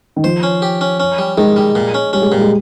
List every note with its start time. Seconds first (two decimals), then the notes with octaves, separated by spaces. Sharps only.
0.16 D#3
0.24 F3 C5
0.43 C#4
0.62 G4
0.81 C#4
1.00 C#4
1.18 G3
1.37 D#3 G#3
1.56 G3
1.75 A#2
1.94 C#4
2.13 G3 C#4
2.22 G#3
2.32 A#2 G3
2.41 G#3